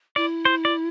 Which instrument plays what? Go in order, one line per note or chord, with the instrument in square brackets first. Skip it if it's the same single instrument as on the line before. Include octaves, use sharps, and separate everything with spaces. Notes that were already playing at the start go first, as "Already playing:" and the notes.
[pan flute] E4 [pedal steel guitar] D5
[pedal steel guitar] C5
D5